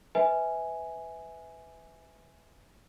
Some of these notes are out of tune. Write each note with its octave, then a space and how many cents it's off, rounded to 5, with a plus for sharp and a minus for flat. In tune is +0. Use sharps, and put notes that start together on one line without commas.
B4 +20 E5 -25 G#5 +0